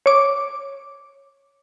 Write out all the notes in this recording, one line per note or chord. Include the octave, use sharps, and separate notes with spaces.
C#5 D6